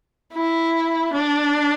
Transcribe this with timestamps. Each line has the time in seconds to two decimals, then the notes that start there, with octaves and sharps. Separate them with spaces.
0.33 E4
1.13 D4